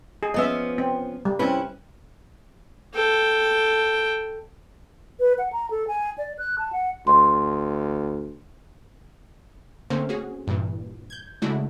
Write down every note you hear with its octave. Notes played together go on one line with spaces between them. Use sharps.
G#4
F3 B3 C#4 D#5 E5
C4
G3
C4 C#4 E4 B4
A4 G5
B4
F#5
A#5
A4
G#5
D5
F#6
A5
F#5
D2 C6
D3 A3 A#3 C4 C#4 C5
C#4 F#4 G#4
G2 A#2 E3
G6 G#6
C#3 G#3 A3 D4 E4 F#4